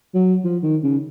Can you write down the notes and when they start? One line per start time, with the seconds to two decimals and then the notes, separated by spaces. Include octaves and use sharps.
0.14 F#3
0.44 F3
0.63 D#3
0.83 C#3